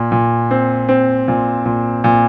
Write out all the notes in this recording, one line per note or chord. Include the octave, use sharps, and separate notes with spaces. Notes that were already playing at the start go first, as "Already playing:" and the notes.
Already playing: A#2
A#2
C4
C4
A#2
A#2
A#2